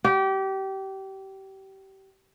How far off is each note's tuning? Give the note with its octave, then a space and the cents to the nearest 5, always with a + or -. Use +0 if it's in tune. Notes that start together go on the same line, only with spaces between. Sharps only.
G4 -25